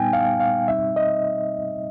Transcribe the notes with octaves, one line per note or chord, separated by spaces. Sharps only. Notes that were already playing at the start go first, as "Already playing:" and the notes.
Already playing: A#2 G3 B3 D#4 G5 G#5
F5
F5
B2 G3 C4 D#4 E5
D#5